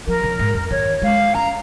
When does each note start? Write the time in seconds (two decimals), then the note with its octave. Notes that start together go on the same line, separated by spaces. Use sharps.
0.07 F3 A#4
0.23 C#3
0.39 G#2
0.54 F2
0.70 D#3 C#5
1.02 G#3 F5
1.34 C#4 A#5